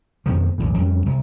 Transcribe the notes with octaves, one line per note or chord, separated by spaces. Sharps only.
F2 B2 D#3 F3
B1 E2 A2
F2 G3 C#4
C2